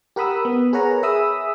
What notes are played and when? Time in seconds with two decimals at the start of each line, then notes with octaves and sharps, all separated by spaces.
0.16 G4 A#4 F#5 B5 D#6 E6
0.45 B3
0.73 G#4 A#4 B4 C#5 F#5 A#5
1.03 G#4 E5 B5 D#6 E6